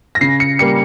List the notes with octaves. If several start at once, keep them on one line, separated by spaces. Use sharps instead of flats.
A#6
C#3 C7
C#7
G3 A#3 C#7